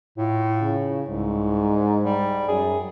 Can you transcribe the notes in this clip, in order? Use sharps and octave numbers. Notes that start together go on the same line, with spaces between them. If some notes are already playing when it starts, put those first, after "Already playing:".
A2 F4
C#3
C2 G#2
G3
F#2 G#4